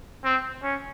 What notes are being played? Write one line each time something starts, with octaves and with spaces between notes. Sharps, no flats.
C4
C#4